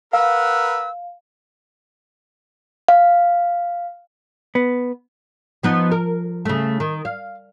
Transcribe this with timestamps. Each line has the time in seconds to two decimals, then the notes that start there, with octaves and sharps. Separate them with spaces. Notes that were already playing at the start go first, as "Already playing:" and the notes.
0.13 A#4 B4 F5 F#5 E6
2.88 F5
4.55 B3
5.63 F3 B3 D#4
5.92 A#4
6.45 C#3 A3
6.80 D#3
7.05 F5